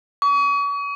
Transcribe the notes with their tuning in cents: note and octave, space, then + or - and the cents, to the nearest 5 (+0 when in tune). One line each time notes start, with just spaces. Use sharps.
C#6 +40